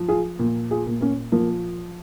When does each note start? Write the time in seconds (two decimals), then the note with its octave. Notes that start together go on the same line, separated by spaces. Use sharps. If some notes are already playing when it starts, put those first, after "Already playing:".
Already playing: F3
0.08 F4 G#4
0.39 A#2
0.71 F4 G#4
0.87 A#2
1.01 A#3 C#4
1.32 F3 A#3